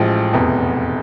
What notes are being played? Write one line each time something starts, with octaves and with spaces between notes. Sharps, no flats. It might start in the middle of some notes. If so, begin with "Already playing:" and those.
Already playing: A1 A2 F3 G#3
F1 E2 B2